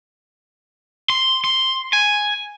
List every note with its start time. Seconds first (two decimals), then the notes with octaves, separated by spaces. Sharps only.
1.10 C6
1.44 C6
1.93 G#5